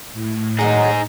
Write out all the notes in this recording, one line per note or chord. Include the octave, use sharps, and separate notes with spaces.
A2
D#3 F#3 G#3 D#4 G#4